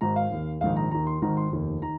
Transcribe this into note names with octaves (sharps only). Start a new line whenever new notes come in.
G#1 G#2 D#3 A#5
F5
D#2 D#3
A#1 G#2 D#3 F5
A#5
D#2 D#3 A#5
C6
G#1 G#2 D#3 A#5
C6
F1 D#2 D#3
D#3 A#5